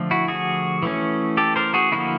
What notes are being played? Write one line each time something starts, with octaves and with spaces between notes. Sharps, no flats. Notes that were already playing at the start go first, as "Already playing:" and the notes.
Already playing: D3 F3 A3
E4 F#4
F#4 G#4
E3 A3 C#4
G4 A4
A#4 C5
F#4 G#4
D3 F3 A#3 E4 F#4